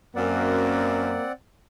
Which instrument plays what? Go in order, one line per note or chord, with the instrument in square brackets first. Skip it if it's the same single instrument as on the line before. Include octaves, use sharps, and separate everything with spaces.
[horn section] F#2 [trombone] A#3 [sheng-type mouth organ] C4 D5 F#5